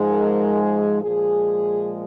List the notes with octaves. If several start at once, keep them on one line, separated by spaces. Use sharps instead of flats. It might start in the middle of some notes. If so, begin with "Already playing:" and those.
Already playing: G#2 F3 G#3
A#4
G#4
A#2 F3 G#3 G#4